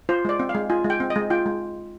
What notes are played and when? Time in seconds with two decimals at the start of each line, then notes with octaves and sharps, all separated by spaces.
0.09 F4 C5
0.25 G#3 D5
0.40 C4
0.49 F5
0.55 G#3
0.70 F4 G#5
0.84 G#3
0.90 G5
1.00 C4
1.10 D#5
1.16 G#3
1.30 F4 G5
1.46 G#3